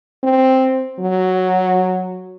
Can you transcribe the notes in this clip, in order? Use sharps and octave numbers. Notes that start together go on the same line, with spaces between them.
C4
F#3